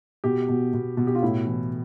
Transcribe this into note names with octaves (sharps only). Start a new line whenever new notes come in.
B2 G4
B2
B2
B2
G4
F4
A2 E4
E3